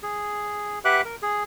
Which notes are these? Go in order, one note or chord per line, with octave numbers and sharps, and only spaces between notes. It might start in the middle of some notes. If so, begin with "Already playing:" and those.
G#4
G4 B4 E5 F#5 D6 F#6
A#4
G#4